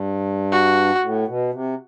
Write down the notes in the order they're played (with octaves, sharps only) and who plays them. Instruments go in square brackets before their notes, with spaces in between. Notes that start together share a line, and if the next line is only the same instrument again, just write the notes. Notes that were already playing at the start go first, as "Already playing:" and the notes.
Already playing: [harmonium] G2
[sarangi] F#4
[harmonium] A2
B2
C3